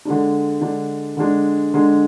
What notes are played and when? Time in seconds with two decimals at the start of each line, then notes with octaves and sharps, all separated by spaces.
0.05 D3 G#3 D4
0.61 D3 G#3 D4
1.17 D3 G#3 D4
1.74 D3 G#3 D4